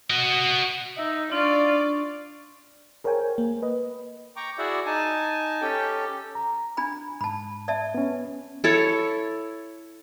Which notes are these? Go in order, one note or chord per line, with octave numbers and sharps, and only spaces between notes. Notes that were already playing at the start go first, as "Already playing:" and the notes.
F#4 D#5
D#4 E5
D4 F4 D5 C#6
G#4 A#4 C5 C#5 G5 G#5
A#3
B4 D#5
G5 A#5 C#6 D6
E4 F#4 G#4 D5 E5 F#5
D#4 G#5 A5
C#4 G4 A4 G5
A#5
D4 G#5 B5
G#2 A5 B5
D5 E5 A5
B3 C#4
E4 A4 C#5